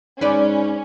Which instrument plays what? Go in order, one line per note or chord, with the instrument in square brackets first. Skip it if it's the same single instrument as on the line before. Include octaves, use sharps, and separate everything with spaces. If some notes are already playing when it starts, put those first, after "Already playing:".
[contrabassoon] G#2 [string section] C#4 [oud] B4 C5 D5